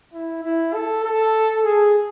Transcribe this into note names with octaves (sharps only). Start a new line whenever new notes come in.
E4
E4
A4
A4
G#4